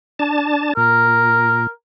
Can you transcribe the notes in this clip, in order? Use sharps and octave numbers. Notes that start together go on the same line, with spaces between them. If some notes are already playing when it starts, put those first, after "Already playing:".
D4 A5
A#2 A#4